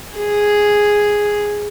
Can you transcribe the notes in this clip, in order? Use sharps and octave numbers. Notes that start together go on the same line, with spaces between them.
G#4